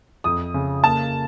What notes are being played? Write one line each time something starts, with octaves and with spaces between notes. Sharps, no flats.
F2 D#6
C#3
A#3 A5